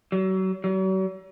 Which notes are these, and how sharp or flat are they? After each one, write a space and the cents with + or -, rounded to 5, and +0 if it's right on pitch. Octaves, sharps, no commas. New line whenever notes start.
F#3 +35
F#3 +45